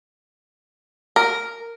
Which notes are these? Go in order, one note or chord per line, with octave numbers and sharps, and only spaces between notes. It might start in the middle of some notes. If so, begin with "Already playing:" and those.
A#4